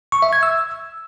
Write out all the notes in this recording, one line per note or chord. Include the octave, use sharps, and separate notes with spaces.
C#6
E5
G#6
E6